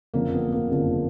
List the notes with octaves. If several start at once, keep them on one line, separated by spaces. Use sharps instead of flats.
F#1 F2 D3 F3 A#3
B3
A#3
F#1 F2 D3 F3